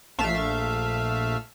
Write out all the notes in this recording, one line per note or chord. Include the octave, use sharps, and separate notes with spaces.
A#1 A3 E5 F5